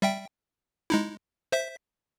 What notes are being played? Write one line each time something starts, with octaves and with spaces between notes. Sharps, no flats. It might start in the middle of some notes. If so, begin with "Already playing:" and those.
G3 E5 G5
G#3 D#4 E4
C5 E5 B6